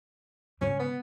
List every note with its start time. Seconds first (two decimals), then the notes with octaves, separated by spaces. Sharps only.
0.61 G#2 C#3 C#4
0.80 B3